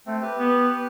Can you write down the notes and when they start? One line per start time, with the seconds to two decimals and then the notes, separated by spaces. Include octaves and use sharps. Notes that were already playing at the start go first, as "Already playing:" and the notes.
0.06 A3 C4
0.22 G4 B4
0.38 B3